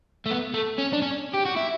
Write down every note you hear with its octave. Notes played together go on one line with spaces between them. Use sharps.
A3
B3
A3
C#4
D4
C#4
G4
F#4
E4